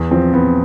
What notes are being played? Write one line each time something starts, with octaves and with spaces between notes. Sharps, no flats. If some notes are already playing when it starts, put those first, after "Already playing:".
Already playing: E2
F3 C4
F3 B3